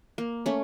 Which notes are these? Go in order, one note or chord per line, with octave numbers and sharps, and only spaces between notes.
A#3
A3 C#4